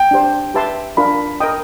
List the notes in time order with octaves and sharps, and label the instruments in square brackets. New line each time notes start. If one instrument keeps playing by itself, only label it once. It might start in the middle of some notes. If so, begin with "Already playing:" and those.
Already playing: [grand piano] G5
[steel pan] D4 G4 C5
G4 B4 E5 A5 C6
[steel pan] D4 F4 A#4 [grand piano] B5
[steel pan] A#4 D#5 G5 [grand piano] D#6